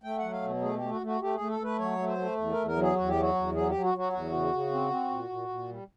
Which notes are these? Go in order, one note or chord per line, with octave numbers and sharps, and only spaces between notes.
A3 G5
F#3 F#5
F5
B2
A3 G#4
A3 G4
F#4
A3
F#4
A3 G4
G#4
A3
A4
A3 B4
F#3 C#5
A3
C5
A3
E2
E2 A#4
A#4
F#3
G#4
E2 F#4
G4
F#3
F#4
E2
F#3 G#4
G4
F#3
F#4
F#3 F#4
E2 F#4
C#3
C#3
C4
C4
A#2
A#2
A#2
G3